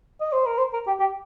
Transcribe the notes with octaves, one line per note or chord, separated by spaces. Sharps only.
D#5
C5
A#4
C5
A#4
G4
G4